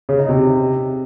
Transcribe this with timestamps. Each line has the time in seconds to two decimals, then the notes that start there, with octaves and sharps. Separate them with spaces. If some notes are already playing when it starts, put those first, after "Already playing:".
0.09 C#3
0.19 D#4
0.29 C3